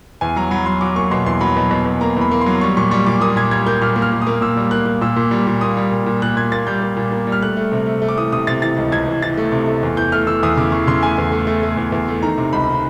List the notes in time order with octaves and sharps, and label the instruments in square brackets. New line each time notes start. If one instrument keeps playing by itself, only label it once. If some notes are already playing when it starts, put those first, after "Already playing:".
[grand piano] E2 G#5
F#3 A#5
F#3 B5
F#3 C6
F#3 D6
A#3 C#6
B2 C6
E2 C6
F#3 B5
B2
B2
B2
A#3 A#5
E2 B5
A#3
F#3 C6
G3 C#6
A#2 C#6
G3 C#6
A#2 D6
A#3 D#6
A#2 G#6
G3 G#6
A#3 G6
A#2 F6
A#3
F6
A#2
D#6
A#3
A#2 E6
G3
A#3 F#6
A#3
A#2 E6
A#2
G3
A#2
A#3 D#6
G3
A#2
A#2
A#2 F#6
A#2 G#6
A#3 A6
G3 G6
A#3
A#2
A#3
G3
F6
A3 F#6
A3
C3
A3
A3
D6
E3 D#6
C3 D#6
C3 A6
E3 A6
C#2
C#2 G#6
E3
E3 A6
A3
C3
A3
E2
E3 G6
A3 F6
E3 E6
E2 D#6
C#3 D6
E3 C#6
C#3 C6
A3 G#5
E2
A3
A3
A3
E2
E2
A3
D#3 A#5
C3
C#2 B5
D#3